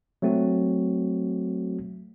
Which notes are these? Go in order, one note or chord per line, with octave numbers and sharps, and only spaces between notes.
F#3 A3 C4 F#4